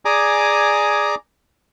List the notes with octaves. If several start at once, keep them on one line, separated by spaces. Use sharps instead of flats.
G#4 D5 G#5 A#5 D6 D#6